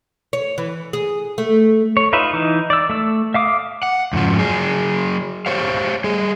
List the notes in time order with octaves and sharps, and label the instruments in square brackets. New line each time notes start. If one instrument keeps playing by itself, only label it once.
[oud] C#5
E3
G#4
A3
[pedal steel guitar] C#5
D#4 F4 B4 E5
E3 D#4
D5 E6
A3 E6
E5 F5 D6 D#6
[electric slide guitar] F#5
F2 G#2 C#3 F3
F#3 G#4
G4 C5 C#5 F5
G3 G#4